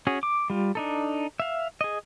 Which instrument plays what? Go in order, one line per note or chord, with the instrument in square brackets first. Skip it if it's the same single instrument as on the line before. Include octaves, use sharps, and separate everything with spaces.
[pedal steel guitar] C#4 F#4 G#4
D6
G3 F4
D4 D#4 A4
E5 F5
G#4 D#5